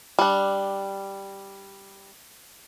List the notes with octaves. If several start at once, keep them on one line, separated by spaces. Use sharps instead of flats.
G3 D4